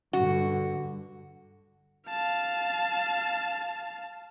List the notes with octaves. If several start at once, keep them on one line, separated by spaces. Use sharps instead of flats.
G2 D3 F#4
F5 A5